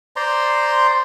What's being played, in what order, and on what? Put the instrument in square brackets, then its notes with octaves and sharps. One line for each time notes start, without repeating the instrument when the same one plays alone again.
[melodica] C5 D5 A#5 C6